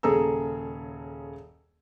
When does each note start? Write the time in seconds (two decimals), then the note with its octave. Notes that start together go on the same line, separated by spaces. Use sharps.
0.03 D#1 C#3 G#4 A4 A#5 E6